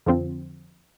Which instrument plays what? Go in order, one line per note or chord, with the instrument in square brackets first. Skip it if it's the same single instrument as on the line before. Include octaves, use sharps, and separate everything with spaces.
[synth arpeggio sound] F2 D3 F3 C4